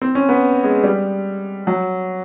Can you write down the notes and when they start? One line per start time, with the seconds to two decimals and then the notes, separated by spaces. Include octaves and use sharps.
0.02 C4
0.15 C#4
0.29 B3
0.64 G#3
0.84 G3
1.67 F#3